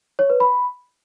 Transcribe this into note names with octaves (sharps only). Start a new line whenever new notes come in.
C#5
B4
B5